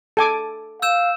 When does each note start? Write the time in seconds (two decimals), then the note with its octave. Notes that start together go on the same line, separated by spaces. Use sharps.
0.17 A4 G#5 D6
0.82 F5 E6 G6 E7